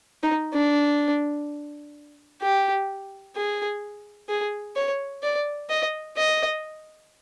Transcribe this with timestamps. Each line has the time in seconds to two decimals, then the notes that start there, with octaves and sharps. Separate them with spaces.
0.23 D#4
0.54 D4
2.42 G4
3.36 G#4
4.29 G#4
4.76 C#5
5.23 D5
5.69 D#5
6.17 D#5